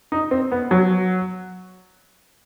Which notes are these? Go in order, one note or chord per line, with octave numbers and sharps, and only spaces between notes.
D#4
C4
B3
F#3